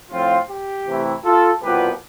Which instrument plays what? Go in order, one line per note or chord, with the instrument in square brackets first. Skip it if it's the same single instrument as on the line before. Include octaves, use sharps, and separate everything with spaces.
[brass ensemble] A2 F3 C4 F4
G4
C3 E3 A3 E4
F4 A4
C2 B2 G3 B3 F4 G4 B4